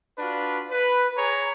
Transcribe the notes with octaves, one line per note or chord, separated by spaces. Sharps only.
D4 F4 F#4 B4
B4
G#4 C#5 A#5